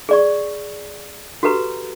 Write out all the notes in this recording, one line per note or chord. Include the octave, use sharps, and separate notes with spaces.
G#4 D5 C#6
F#4 G4 A4 B4 A#5